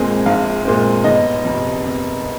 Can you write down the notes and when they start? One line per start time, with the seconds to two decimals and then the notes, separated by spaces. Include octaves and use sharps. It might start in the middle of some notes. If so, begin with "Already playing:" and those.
Already playing: A#1 A#2 G#3 C4 G#5
0.26 A#1 F5
0.65 A#2 G#3 C4
1.04 G1 D#5
1.45 F2 C3
1.83 G1